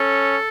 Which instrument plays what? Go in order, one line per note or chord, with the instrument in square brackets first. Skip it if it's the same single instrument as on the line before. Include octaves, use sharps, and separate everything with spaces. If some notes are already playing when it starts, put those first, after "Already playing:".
Already playing: [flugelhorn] C#4 [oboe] A4